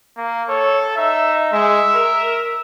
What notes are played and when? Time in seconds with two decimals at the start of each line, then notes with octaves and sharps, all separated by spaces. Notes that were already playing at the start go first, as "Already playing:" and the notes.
0.17 A#3
0.49 A4 C#5
0.97 D#4 E5
1.52 G#3 E5
1.95 A#4